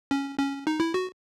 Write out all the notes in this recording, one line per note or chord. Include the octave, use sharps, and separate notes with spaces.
C#4
C#4
D#4
E4
F#4